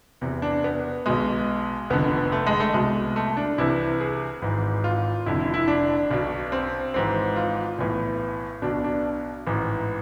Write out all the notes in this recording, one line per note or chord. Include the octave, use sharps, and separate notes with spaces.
E1 E2 C3
D4
B3
B1 B2 G#3
F1 F2 D3 B3
A3
G#3
A3
C2 B2 G#3
A3
D4
C2 C3 E3 E4
G#4
G#1 G#2 E3
F4
F1 F2 D3 E4
E4
E4
D4
B1 B2
C4
G#1 G#2 E3 C4
F4
B1 A2 E3
B1 B2 D4
D4
A1 G#2 E3